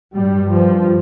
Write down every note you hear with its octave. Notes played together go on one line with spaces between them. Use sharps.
G2 G3
F3